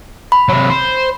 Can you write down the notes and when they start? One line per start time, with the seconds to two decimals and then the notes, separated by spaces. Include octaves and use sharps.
0.32 B5
0.49 C3 F#3
0.70 C5